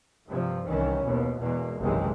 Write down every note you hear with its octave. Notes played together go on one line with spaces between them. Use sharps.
G2 C3 F3
C2 D#3 E3 C#4
D#2 B2
E2 B2 G#3 A#3
F#1 B1 C3 D#3 E3 G#3